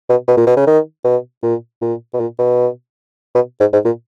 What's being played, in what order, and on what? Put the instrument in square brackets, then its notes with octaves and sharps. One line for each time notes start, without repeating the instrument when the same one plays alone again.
[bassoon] B2
B2
A#2
B2
C#3
D#3
B2
A#2
A#2
B2
A#2
B2
B2
G#2
G#2
A#2